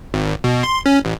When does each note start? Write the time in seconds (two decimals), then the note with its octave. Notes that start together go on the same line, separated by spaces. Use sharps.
0.14 G#1
0.44 B2
0.63 C6
0.86 C#4
1.05 A1